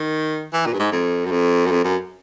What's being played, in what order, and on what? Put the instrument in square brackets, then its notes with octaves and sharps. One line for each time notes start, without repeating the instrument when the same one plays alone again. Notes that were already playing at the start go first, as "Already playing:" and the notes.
Already playing: [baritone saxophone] D#3
E3
A#2
G2
G#2
F2
F#2
F2
F#2
F2
F#2